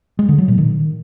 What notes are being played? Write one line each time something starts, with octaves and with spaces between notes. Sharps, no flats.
G#3
D3
F#3
A#2
D#3